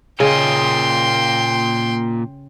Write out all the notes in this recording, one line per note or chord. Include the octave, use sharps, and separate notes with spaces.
A#2 C#3 D#5 G5 C6